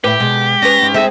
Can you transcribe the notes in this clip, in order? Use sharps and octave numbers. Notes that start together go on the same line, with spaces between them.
A2 G4 B4 E5
B2 G#3
C#4 B4 A#6
G#2
G#3 C4 D#4 A4 E5